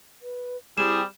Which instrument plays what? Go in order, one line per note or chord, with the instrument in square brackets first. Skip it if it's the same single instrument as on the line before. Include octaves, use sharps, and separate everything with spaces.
[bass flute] B4
[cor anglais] G3 [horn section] C4 G4 G#4 [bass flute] E4 [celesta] E7